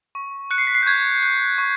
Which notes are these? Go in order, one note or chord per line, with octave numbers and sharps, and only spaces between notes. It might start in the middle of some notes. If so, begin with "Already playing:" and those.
C#6
F#6 C#7
C7
B6
C7
G6
C#6 G#6
F#6
C#6